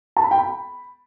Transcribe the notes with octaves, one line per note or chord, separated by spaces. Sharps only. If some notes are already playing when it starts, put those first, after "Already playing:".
A5
B5
G5
B5